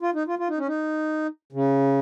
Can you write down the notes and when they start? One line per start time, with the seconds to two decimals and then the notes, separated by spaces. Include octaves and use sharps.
0.02 F4
0.14 D#4
0.27 F4
0.39 F4
0.49 D#4
0.58 C#4
0.68 D#4
1.53 C#3